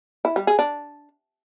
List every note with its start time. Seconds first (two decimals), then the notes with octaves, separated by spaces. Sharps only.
0.25 E4
0.36 G3
0.47 G#4
0.59 D4